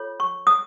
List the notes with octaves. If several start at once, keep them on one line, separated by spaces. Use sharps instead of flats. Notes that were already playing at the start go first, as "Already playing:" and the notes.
Already playing: F4 A4 C#5
C#6
D#6